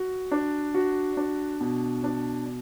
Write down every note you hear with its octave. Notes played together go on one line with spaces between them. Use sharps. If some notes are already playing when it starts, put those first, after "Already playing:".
Already playing: F#4
D4
F#4
D4
B2
D4